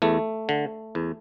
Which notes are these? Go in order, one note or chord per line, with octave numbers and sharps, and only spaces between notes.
E2 A3
D3
E2